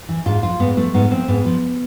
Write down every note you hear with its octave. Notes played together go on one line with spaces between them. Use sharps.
E3
G#2 F4
F3 F4
G#2 B3
F3 A3
G#2 B3
F3 C4
G#2 B3
F3